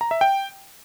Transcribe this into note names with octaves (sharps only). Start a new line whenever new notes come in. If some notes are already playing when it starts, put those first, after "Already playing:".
A#5
E5
G5